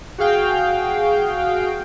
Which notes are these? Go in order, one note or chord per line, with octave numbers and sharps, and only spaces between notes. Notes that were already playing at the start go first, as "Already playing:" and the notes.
F#4 G#4 F5 G5